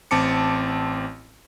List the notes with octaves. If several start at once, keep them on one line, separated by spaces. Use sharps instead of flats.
A1 C4 A5 D6 C#7